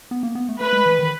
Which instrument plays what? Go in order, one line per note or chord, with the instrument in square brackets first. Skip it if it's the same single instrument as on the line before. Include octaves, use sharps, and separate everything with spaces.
[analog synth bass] B3
A#3
B3
A3
[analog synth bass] A3 [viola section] B4
[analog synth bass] G#3
E3
D#3